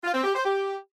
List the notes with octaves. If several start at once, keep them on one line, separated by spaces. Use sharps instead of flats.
F4
C4
G4
C5
G4